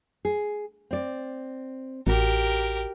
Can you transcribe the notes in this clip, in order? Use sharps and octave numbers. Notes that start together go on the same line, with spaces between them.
G#4
C4 D5
A1 F#4 G4 A#4